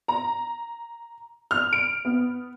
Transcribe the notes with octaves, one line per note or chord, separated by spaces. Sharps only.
A#5
F6
D7
B3